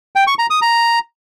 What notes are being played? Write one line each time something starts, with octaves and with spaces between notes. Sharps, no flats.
G5
C#6
A#5
D#6
A#5